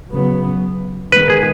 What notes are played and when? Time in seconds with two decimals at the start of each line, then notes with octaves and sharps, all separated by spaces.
0.11 C#3 F#3 B3
1.12 D#3 G#3 B3 B4
1.30 G#4